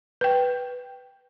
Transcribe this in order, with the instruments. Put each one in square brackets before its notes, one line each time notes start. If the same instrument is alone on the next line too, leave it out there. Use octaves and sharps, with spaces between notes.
[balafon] B4 G5